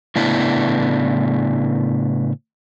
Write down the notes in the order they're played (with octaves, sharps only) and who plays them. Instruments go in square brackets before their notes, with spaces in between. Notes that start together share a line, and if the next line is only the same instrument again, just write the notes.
[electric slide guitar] A2 C#3 B3 D4 E4